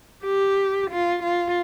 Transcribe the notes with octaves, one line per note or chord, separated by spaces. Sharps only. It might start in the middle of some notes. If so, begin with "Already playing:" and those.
G4
F4
F4